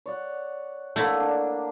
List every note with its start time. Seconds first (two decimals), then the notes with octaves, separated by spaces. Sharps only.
0.06 C#5 D5 F#5
0.96 D3 A3 A#3 E4
1.20 D4